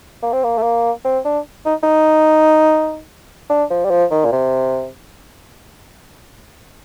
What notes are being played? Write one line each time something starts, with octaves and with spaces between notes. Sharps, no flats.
A#3
C4
A#3
A3
A#3
C4
D4
D#4
D#4
D4
F3
G3
F3
D#3
A#2
C3